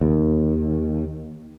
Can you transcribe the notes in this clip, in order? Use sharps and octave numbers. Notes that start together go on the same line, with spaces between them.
D#2